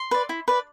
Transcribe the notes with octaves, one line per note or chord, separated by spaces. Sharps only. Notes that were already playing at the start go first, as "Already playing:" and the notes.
Already playing: C6
B4 D5
E4
B4 D5